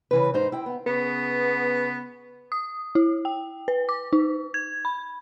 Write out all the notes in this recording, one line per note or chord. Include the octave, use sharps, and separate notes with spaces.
C#3 E3 B4
G#2 D#4 C5
E4 G5
B3
C#3 B3
D#6
E4
G5
B4
D6
D#4
G#6
B5